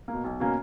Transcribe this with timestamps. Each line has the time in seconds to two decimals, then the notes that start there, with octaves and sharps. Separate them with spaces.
0.08 B2 A#3
0.24 B1
0.40 B2 A#3 C#4